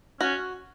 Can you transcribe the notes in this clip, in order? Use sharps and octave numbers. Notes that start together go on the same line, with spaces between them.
C#4 F#4